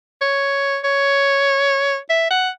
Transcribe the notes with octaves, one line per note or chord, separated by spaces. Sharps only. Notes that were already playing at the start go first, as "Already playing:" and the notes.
C#5
C#5
E5
F#5